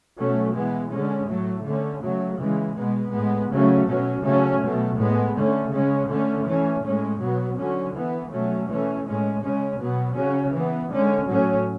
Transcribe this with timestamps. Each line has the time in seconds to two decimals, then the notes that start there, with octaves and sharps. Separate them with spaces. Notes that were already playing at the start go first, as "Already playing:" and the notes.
0.17 B2 F#3 A3 C#4
0.54 E3 G#3 B3
0.91 D3 G#3 C#4
1.28 A2 F#3 A3
1.65 D3 A3 C#4
2.02 C#3 F#3 A3
2.39 C#3 E3 G#3
2.76 B2 G#3 B3
3.13 A2 G#3 B3
3.50 C#3 F#3 A3 C#4
3.87 B2 F#3 C#4
4.24 C#3 F#3 A3 C#4
4.60 B2 F#3 A3
4.97 A2 G#3 B3
5.35 D3 A3 C#4
5.72 C#3 G#3 C#4
6.09 D3 A3 C#4
6.46 E3 A3 C#4
6.83 A2 G#3 C#4
7.20 B2 F#3 B3
7.57 D3 F#3 C#4
7.95 E3 B3
8.31 B2 F#3 A3 C#4
8.68 E3 A3 C#4
9.05 A2 G#3 C#4
9.42 C#3 G#3 C#4
9.80 B2 F#3 B3
10.16 C#3 F#3 C#4
10.53 E3 B3
10.90 D3 G#3 C#4
11.27 A2 F#3 C#4